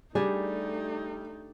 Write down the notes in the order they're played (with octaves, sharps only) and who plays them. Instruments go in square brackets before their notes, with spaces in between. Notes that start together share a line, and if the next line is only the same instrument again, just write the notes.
[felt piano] G3 [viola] A3 D#4 [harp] D4 G4 [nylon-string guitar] G#4